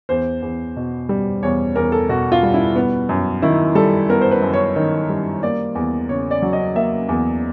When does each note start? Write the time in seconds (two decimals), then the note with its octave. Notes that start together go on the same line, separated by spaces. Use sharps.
0.09 E2 C5
0.42 E2
0.77 B2
1.09 G3
1.43 E2 C#5
1.76 E2 A#4
1.92 A4
2.09 B2 F#4
2.32 F4
2.43 G3
2.54 E4
2.76 B3
3.09 F#2
3.42 D#3 E4
3.75 G3 A4
4.09 B3 A#4
4.21 C5
4.31 B4
4.42 F#2
4.53 C#5
4.76 D#3
5.09 G3
5.43 A#3 D5
5.75 E2
6.09 C#3 C#5
6.31 D5
6.42 F#3
6.53 D#5
6.75 A#3 E5
7.09 E2